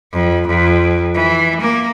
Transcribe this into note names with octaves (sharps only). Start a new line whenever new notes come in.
F2
F2
E3
A#3